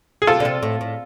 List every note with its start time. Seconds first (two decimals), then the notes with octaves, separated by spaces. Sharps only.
0.22 G#4
0.27 C3 F4 A4
0.40 D3
0.45 C3
0.63 A2
0.81 A2